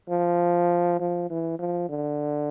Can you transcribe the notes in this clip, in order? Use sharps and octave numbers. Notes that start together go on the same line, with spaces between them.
F3
F3
E3
F3
D3